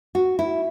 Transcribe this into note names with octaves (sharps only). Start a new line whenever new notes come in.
F#4
E4